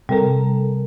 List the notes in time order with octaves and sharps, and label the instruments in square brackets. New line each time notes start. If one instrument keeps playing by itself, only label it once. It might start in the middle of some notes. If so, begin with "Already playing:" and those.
[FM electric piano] C3 A4 A#4 [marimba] G3